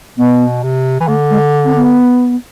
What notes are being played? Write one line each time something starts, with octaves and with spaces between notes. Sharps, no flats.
B2 B3
C3
E3
D3 A3
G#3
C4
B3